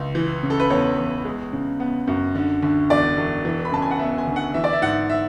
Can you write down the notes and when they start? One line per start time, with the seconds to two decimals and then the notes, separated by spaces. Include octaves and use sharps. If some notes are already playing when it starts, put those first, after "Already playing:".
Already playing: C#2
0.15 E3
0.43 C#3
0.50 A4
0.60 B4
0.70 E2 C#5
0.98 E2
1.25 G#3
1.53 C#3
1.80 B3
2.07 F#2
2.35 D3
2.63 D2
2.90 E1 D5
3.17 E1
3.45 E3
3.65 B5
3.72 C#3 A5
3.82 G#5
3.91 F#5
3.99 B3 E5
4.18 G#5
4.27 D2
4.36 F#5
4.54 E3 E5
4.64 D5
4.73 E5
4.82 G#2 F#5
5.09 E5